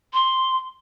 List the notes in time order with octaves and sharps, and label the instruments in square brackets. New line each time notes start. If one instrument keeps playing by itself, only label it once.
[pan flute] C6